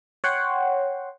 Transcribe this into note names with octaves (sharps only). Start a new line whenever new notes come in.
C#5 F#5 G5 C6